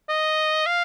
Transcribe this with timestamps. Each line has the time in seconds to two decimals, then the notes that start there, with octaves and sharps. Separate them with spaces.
0.09 D#5
0.66 F5